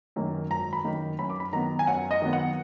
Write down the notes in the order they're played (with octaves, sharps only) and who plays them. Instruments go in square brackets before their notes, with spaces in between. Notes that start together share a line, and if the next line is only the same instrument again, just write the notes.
[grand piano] F#2 D#3 A#3
G#1 A#5
B5
F#2 D#3 A#3
F#2 B5
D6
B5
D#3 F#3 B3 A#5
G#5
F#2 F#5
D#5
D#3 F#3 B3
F#5